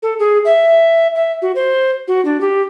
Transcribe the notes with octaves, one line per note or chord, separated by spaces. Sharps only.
A4
G#4
E5
E5
F#4
C5
F#4
D4
G4